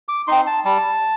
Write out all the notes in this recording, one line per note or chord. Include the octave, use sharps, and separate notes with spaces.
D6
C4 D#4 C6
A5
G3 A5